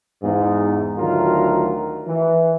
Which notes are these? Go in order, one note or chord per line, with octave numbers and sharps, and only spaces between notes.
E2 G#2
D2 D#3 F#3 F4 A#4
E3